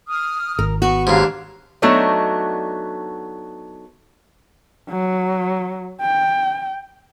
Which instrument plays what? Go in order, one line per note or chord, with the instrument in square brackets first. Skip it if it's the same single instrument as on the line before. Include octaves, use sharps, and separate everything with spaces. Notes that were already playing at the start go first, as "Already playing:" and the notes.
[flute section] D#6 F6
[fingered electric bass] G#1 [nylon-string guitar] A#4
[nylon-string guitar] B3 F#4 [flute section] C#6
[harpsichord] D#2 G#2 [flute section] D4 F5
[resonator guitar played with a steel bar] F#3 A3 B3 D4 D#4
[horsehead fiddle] F#3
G5